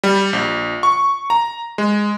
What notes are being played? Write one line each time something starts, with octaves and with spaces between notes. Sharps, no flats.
G3
A#1
C#6
A#5
G#3